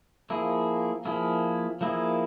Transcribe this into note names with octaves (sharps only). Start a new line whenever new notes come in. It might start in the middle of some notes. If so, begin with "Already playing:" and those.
F3 A#3 E4 G#4
F3 A#3 E4 G#4
F3 A#3 E4 G#4